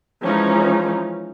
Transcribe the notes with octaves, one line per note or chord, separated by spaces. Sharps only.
E3 F3 G#3 C#4 D#4